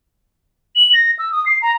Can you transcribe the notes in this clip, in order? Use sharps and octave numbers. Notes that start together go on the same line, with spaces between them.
F#7
A#6
E6
D#6
C7
A#5